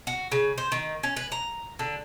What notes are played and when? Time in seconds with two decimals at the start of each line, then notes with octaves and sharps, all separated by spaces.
0.07 F#4
0.32 C#3
0.58 C5
0.72 D#3
1.03 C#4
1.16 B4
1.32 A#5
1.79 D3